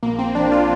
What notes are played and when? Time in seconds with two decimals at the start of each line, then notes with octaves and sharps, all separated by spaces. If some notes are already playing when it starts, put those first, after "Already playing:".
0.03 A#1 A#3
0.19 C4
0.35 F3 D4
0.52 F4